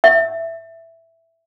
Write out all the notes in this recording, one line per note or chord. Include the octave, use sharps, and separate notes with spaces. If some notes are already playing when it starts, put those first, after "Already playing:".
E5